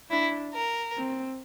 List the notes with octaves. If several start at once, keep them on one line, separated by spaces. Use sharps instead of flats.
D4 E4
A#4
C4